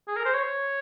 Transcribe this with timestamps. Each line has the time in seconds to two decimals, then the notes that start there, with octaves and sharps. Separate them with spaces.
0.08 G#4
0.17 A#4
0.25 C5
0.34 C#5